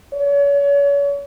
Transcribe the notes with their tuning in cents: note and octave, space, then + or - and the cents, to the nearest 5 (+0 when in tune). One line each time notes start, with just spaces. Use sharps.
C#5 +35